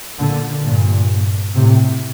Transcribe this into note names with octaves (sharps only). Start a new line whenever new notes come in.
A#2 D3
G2 A#2
A2 C3